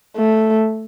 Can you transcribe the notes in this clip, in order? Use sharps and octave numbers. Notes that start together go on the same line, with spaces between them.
A3